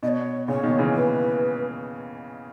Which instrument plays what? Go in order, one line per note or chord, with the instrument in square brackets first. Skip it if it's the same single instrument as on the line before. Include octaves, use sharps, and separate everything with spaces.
[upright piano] B2 [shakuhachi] D#5
[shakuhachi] C#5
[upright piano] A#2 C#3 [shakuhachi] C#5
[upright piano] B2 D#3
C#3 E3
[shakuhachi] B4